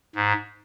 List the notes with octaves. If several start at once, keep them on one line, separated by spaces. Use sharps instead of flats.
G#2